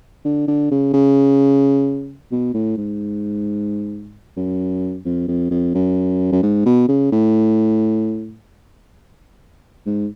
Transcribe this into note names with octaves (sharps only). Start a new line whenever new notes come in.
D3
D3
C#3
C#3
B2
A2
G#2
F#2
F2
F2
F2
F#2
F#2
G#2
B2
C#3
A2
G#2